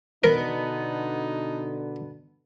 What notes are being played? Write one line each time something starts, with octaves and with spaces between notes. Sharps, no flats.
B2 D3 B3 D#4 A#4